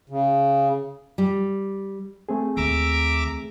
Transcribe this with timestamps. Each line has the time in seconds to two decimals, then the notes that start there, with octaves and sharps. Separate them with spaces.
0.09 C#3
1.18 G3
2.29 A3 C4 G#4
2.57 D#2 E5 A#5 D6